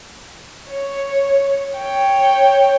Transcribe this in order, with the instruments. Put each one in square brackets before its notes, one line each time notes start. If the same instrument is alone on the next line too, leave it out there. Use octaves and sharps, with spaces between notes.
[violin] C#5
C#5 G5